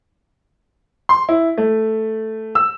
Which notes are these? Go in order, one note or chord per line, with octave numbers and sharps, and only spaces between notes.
C6
E4
A3
E6